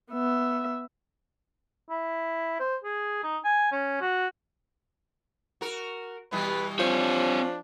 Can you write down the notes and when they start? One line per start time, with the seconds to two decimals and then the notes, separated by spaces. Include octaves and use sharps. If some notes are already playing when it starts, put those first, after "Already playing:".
0.12 B3 E5
1.90 E4
2.60 C5
2.84 G#4
3.24 D#4
3.44 G#5
3.72 C#4
4.01 F#4
5.61 F#4 A#4
6.32 B2 E3 G3 B4
6.79 F3 C4 D4 C#5